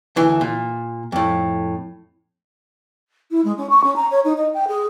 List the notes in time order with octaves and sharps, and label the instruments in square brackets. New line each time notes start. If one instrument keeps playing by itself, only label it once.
[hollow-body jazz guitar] D2 E3
A#2
F2 A2
[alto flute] E4
G#3
C#4
C#6
C#4
A#5
C#5
D#4
D#5
G5
G#4